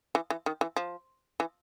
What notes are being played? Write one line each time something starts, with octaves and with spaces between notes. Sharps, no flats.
E3
E3
D#3
E3
F3
E3